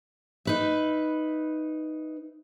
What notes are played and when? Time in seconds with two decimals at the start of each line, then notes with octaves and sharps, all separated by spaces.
0.45 D#4 B4 E5